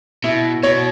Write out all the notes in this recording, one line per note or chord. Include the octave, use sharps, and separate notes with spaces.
B2 E4
B2 C#5